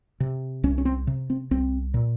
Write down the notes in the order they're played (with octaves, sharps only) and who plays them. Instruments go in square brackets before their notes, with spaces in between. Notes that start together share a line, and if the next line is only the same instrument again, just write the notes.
[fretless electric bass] C3
C2 C#4
C#4
C4
C3
C4
C2 C4
A#2